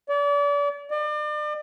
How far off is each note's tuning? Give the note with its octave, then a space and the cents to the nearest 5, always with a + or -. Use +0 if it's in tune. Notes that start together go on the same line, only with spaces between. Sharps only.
D5 -35
D5 +40